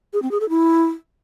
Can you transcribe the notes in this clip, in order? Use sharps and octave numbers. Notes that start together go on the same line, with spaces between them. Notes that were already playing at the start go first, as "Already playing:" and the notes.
G#4
C4
G#4
A4
E4